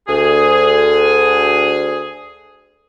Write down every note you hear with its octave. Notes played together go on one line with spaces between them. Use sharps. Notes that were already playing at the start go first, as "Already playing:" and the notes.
D2 G#4